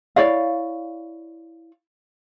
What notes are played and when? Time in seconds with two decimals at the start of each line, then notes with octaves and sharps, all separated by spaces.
0.16 E4 C#5 D5 F5